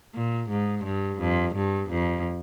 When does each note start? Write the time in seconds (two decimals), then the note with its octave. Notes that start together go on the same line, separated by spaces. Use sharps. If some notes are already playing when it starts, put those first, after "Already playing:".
0.14 A#2
0.50 G#2
0.84 G2
1.20 F2
1.55 G2
1.90 F2